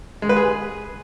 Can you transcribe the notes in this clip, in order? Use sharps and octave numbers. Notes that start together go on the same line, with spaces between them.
G#3
B4
G#4